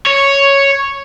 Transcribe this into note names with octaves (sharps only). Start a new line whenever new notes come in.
C#5